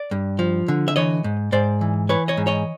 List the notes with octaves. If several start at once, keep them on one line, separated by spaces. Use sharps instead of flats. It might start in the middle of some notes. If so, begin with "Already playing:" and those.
Already playing: D5
G2
F3
D3
E5
E3 C#5 D#5
G#2
G#2 C5 D5
E3
E3 B4 C#5
C#5 D#5
G#2
C#5 D#5